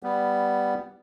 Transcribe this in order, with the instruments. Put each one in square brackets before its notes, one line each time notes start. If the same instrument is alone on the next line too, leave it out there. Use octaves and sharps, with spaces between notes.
[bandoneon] G3 B3